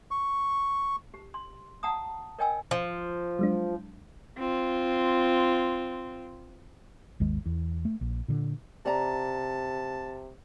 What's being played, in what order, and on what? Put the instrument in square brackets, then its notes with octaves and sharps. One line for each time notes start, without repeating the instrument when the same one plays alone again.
[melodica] C#6
[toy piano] G4
C6
F#5 A5 A#5 D#6
A#4 C#5 D#5 G5 G#5 E6
[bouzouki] F3
[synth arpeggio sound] F#3 G#3 D4
[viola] C4 F4
[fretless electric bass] G#1 D#2 D#3 G#3
E2
A3
A#1
A#2 D3
[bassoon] C3 [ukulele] D5 A#5 [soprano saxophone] A5